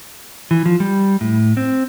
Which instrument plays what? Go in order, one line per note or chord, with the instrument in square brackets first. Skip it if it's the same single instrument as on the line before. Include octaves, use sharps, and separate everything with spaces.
[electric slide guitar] E3
F3
G3
A2
C4